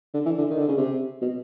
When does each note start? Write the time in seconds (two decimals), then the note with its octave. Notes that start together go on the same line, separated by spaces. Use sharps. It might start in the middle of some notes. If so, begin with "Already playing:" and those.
0.14 D3
0.26 E3
0.38 D3
0.50 D#3
0.59 D3
0.68 C#3
0.77 C3
1.21 B2